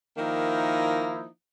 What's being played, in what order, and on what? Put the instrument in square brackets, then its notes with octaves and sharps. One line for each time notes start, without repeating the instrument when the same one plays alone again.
[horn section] D#3 F3 A#3 D#4 E4